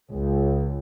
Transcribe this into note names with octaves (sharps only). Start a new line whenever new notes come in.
C#2